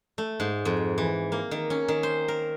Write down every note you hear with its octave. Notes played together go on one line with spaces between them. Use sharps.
A3
G#2
F2
E3
A#3
D#3
C#4
D#3
C5
A#4